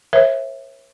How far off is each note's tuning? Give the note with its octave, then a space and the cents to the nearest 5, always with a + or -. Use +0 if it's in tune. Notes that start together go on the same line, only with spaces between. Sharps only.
A#4 +45 C#5 -35 E5 +0